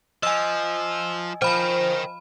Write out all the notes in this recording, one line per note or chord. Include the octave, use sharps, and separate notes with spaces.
F3 D#5 G#5 E6
F3 A#4 C5 G5 B5